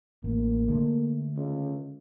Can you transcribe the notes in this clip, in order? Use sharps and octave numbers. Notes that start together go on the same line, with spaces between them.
A1 A#3
D3 G#3 A3
C#2